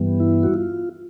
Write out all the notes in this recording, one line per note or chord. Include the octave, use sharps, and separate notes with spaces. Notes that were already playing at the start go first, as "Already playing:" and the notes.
Already playing: G2 E3 G3 B3
E4
F#4
F4